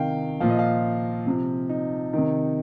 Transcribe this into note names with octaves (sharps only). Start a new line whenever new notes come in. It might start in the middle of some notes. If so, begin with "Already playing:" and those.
Already playing: C3 D#3 F5 G5
A#2 F3 F5
D#5
F5
C3 F3
D#4
C3 D#3